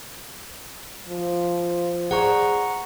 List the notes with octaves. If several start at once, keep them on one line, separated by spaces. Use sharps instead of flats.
F3
G#4 C5 D5 F#5 A#5 C#6